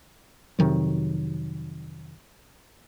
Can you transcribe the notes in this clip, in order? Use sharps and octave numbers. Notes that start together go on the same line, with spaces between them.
F2 C3 D#3 F#3